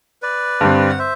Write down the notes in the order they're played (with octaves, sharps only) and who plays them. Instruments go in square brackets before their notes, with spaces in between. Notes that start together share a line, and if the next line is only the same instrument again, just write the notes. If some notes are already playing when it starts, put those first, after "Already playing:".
[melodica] B4 D5
[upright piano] G2 D3 G3 C4
[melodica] F#5
C5 E5